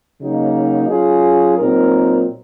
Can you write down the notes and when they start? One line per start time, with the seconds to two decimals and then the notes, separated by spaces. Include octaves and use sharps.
0.21 C#3 F#3 A#3 D#4
0.89 F#3 C#4 F4 G#4
1.58 A#2 F#3 C4 D#4 A#4